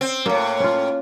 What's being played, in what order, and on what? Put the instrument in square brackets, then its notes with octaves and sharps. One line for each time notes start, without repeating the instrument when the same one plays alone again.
[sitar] C4
[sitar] F#2 A2 [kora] A#3
[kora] C#4 F4